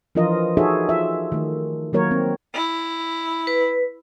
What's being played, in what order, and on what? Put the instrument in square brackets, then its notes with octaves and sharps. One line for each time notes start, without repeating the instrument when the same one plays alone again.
[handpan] E3 F3 D4 F4 A#4 D#5
D#4 F#4 G#4 A4 C#5 E5
F4 E5
D#3 A3
D#3 F#3 A#3 F#4 A#4 C#5
C4
[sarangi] E4
[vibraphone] B4